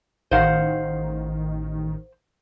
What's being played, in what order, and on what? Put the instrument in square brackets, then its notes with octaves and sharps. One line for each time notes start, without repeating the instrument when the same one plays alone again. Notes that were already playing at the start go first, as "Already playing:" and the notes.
[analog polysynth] A1 D#3 [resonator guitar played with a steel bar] C5 F5 F#5